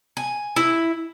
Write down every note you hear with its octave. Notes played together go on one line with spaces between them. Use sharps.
G#5
E4